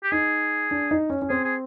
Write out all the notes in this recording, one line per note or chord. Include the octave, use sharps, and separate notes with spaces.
G4
D#4 G#4
D4
D#4
C#4
C#4
C4 G#4
G#4